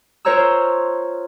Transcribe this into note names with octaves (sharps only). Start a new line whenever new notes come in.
F4 A#4 C5 C#5 A#5 E6